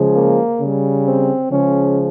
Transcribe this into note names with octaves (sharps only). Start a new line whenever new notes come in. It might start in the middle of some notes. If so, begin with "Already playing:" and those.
Already playing: C#3 F3 G#3
A#3
C#3 G3
C4
C#3 F3 G#3 C#4